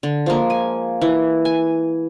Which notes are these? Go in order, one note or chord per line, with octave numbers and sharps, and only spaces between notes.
D3
F3 G#3 A#3
G#5
E3
G#5